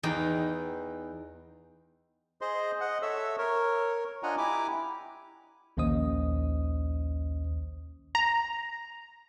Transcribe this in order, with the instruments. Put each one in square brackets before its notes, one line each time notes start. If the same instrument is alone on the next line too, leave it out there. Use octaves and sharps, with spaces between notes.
[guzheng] E2 D#4 D#5 G5
[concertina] G#4 C5 D#5 C6
D#5 F#5
A4 C#5 E5 E6
A#4 C#5
D4 F4 D#5 F#5 G#5 A#5
E4 G4 G#5 A#5 D6
[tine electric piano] A#1 D#2 C#4 C5 D#5 D#6
[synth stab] A#5